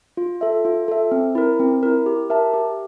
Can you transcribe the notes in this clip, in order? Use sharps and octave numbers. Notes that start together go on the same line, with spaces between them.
F4
A4 E5
F4
A4 E5
C4
E4 A#4
C4
E4 A#4
G4
A#4 E5 A5
G4